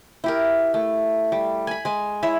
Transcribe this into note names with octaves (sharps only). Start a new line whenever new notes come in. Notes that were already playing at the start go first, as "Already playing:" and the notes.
E4 G4 A#4
A3
G3
G#5 B5
G#3 G#5
E4 C#5 E5